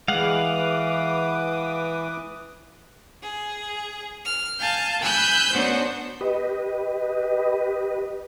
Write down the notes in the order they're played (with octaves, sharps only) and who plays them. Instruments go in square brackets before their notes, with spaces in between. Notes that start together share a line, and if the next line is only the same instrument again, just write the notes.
[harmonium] E3 [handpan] G#3 [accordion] B4 D6 D#6 [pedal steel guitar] F5 F#5
[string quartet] G#4
F6
F5 G#5 A5 F6 G6
G#5 B5 E6 F#6 G6
B3 C#4 D4 F#4 C5
[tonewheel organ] G4 B4 D#5